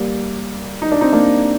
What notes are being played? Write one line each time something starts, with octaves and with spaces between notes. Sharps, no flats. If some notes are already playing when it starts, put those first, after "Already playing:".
Already playing: G3 A#3
D#4
D4
C4 D#4
A#3 D4